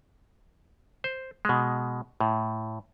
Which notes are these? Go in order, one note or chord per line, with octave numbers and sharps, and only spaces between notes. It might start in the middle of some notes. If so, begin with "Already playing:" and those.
C5
B2 G#3
A2